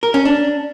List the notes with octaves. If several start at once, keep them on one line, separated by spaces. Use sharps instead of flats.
A#4
C#4
D4